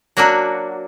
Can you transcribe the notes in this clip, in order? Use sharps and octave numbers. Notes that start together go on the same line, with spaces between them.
F#3 A#3 D4 F#4